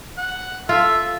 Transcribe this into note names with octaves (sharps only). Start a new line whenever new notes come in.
F#5
F4 A4 E5